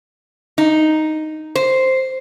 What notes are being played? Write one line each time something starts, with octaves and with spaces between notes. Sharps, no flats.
D#4
C5